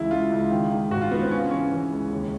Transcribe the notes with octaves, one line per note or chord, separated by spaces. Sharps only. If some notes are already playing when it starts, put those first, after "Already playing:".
Already playing: C#2 E3 E4
C#2 F4
C#2
D#3
D#3
G#1 F#4
F4
D#3 B3
C4
C#3 C#4
E3 C#4
E3
C#2
D#2